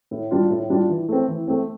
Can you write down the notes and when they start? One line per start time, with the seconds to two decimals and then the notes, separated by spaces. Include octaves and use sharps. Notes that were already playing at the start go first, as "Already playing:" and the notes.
0.11 A2
0.31 G3 D4 F4
0.50 A2
0.70 G3 D4 F4
0.89 E3
1.09 A3 C4
1.28 E3
1.48 A3 C4